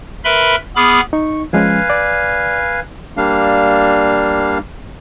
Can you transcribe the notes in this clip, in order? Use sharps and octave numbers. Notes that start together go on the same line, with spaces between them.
A#4 B4 E5 B5 C6
B3 G#4 B5 D6 F6
D#4 C#6
F3 G#3 C#4 B4 F5 G#5
D5
G3 A#3 D4 F5